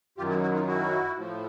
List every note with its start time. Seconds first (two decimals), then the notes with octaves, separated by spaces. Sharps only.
0.17 F#2 D#3 F#3 F4 G4
0.30 E4 F#4
0.42 E4 F#4
0.55 D#4 F4
0.67 E4 F#4
1.16 A2 F3